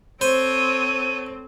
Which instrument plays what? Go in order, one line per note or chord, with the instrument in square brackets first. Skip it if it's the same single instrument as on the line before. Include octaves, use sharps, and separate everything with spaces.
[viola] C4 [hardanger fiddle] A4 C#5 [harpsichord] C5 [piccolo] D#7